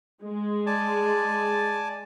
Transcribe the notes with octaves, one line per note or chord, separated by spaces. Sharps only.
G#3
D5 G#5 A5